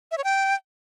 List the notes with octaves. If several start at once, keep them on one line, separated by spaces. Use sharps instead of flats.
E5
C#5
G5